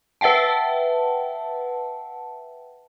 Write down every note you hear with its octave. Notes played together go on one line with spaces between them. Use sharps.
B4 E5 F#5 G5 A5